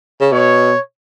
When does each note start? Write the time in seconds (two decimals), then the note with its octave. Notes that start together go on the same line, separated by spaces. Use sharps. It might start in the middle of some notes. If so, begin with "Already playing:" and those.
0.21 C#3
0.31 B2 C#5